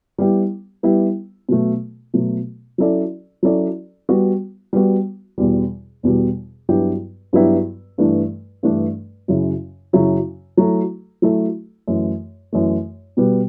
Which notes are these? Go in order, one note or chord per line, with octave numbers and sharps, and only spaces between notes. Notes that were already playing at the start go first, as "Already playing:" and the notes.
G3 B3 E4 G4
G3 B3 E4 G4
B2 F#3 A3
B2 F#3 A3
F#3 C#4 E4 A4 D5
F#3 C#4 E4 A4 D5
G3 B3 F#4
G3 B3 F#4
E2 B2 G3
E2 B2 G3
G2 F#3 B3 E4 G4
G2 F#3 B3 E4 G4
G2 E3 A3 D4
G2 E3 A3 D4
F#2 C#3 F#3 C#4 E4
F#2 C#3 F#3 C#4 E4
F#3 A3 E4 A4
F#3 A3 E4 A4
F#2 E3 A3
F#2 E3 A3
B2 G3 B3